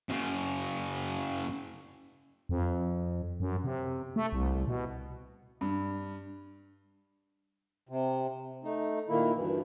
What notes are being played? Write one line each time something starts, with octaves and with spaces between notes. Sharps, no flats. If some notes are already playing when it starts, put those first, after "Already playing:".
F#2 C#3
F2
F#2
C3
A3
C2
B2
G2
C3
A3 D#4
A#2 D#3 A#3 E4
D2 G2 E3